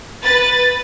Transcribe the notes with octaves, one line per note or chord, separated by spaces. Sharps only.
B4 A6